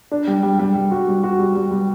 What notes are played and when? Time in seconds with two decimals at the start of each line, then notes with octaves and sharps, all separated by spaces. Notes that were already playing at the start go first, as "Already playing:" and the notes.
0.11 D4
0.27 G3
0.43 G3
0.59 G3
0.75 G3
0.91 F#4
1.08 G3
1.24 F#4
1.39 G3
1.55 G3
1.71 G3